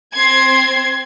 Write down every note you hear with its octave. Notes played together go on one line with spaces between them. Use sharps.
C4 C6 G#6